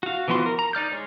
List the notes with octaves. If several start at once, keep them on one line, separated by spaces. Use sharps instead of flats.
F#4 F5
E3 F3 B3 F#4 C6
A#4
A#5
D#4 D5 F6 G6
G#3 C#5